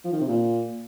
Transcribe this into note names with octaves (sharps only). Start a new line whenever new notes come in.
F3
D#3
C3
A#2